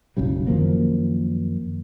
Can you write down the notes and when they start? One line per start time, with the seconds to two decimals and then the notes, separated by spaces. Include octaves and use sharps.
0.17 F#1 B1 C#3 G3
0.47 F#2 D#3 F3 A#3